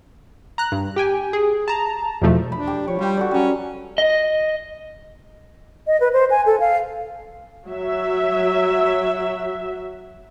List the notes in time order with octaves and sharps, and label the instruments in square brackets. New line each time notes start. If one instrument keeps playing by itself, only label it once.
[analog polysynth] A#5 F#6
G2
G4 G5 G#5
G#4
A5 A#5
E2 B2 F3 A3
[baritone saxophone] D4 [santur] B5
[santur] G4
[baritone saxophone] F3 [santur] C#5
[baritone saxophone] G3 [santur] F4 G5
[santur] F#4 A4 D5
[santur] F#3 G3 [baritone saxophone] C#4
[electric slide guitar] D#5
[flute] D#5
B4
C5
G#5
A4
F5
[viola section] F#3 E5